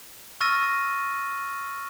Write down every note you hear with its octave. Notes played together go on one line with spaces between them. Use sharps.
C#6 E6 F6 A6 A#6 D#7